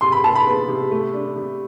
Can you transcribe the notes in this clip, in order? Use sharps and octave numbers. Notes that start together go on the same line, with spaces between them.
C3 C6
B5
C3 A5
B5
B3
C3
A3
D4
C3